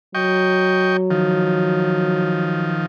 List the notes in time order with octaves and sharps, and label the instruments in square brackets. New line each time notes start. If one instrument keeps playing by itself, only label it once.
[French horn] F#3 [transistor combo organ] D#5 G5 C#6
[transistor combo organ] D#3 F3